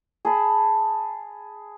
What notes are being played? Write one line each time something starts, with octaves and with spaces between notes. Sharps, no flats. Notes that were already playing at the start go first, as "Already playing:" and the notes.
G#4 A5 B5